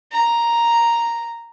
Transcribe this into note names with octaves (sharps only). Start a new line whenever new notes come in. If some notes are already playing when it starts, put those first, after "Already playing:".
A#5